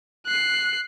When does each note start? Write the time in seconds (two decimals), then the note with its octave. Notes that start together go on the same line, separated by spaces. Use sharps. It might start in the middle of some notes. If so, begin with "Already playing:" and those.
0.26 F#6 C7